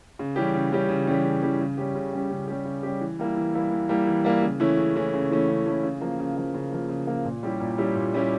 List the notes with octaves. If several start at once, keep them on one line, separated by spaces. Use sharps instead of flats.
C#3
E3 G3 C#4 G4
C#3
E3 G3 C#4 G4
C#3
E3 G3 C#4 G4
C#3
E3 G3 C#4 G4
C#3
G3 C#4 G4
C#3
G3 C#4 G4
C#3
G3 C#4 G4
C#3
G3 C#4 G4
E3
G3 A#3 E4
E3
G3 A#3 E4
E3
G3 A#3 E4
E3
G3 A#3 E4
C#3
E3 A3 C#4 E4
C#3
E3 A3 C#4 E4
C#3
E3 A3 C#4 E4
C#3
E3 A3 C#4 E4
C#3
F3 A#3
C#3
F3 A#3
C#3
F3 A#3
C#3
F3 A#3
A#2
G3 C#4 E4 G4
A#2
G3 C#4 E4 G4
A#2
G3 C#4 E4 G4